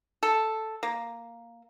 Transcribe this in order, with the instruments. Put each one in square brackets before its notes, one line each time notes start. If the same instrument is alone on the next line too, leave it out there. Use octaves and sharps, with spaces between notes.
[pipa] A4
A#3